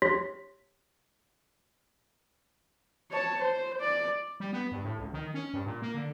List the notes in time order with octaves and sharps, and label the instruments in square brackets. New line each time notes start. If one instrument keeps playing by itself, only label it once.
[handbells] G4 C#5 C6 A#6 B6
[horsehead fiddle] C#5 A5
C5
D5
[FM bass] G3
B3
G2
A2
C#2
D#3
C#4
G2
A#2
A#3
D3